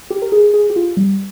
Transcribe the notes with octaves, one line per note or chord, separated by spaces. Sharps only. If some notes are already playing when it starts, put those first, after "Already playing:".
G4
A#4
G#4
G#4
G4
F4
G3